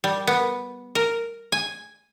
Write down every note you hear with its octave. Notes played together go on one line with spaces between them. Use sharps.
G3
B3
A#4
G#5